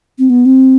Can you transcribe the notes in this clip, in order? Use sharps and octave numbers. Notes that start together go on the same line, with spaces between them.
C4
B3
C4